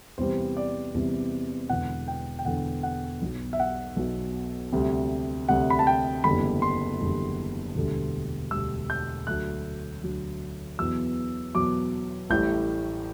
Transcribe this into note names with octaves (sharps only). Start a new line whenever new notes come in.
E2 C3 G3 C5
D5
E2 C3 G3
E1 E2 D3 F#5
G5
G5
E1 E2 D3 F#5
F#5
B1 B2 F#3
E5
F#5
B1 B2 F#3
D2 C3 G3
D2 C3 G3 F#5
B5
A5
G5
F#1 E2 D3 G3 B5
C6
F#1 E2 D3 G3
E1 D2 D3 G3
E1 D2 D3 G3 E6
G6
D2 D3 F#3 F#6
D2 D3 F#3
E2 B2 F#3 E6
E2 B2 F#3 D6
A1 A2 G3 G6